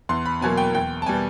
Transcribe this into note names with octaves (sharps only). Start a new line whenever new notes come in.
E2 C6
B5
B2 F#3 A#3 G#5
G5
E2 G5
A5
B2 G3 B3 G#5